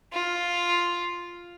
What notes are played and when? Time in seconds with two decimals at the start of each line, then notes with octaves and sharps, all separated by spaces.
0.13 F4